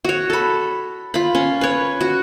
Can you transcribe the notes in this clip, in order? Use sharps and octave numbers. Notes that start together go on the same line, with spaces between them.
F#4 C#5
A4 B5
F4 B5
C#4
B4 C#5
F#4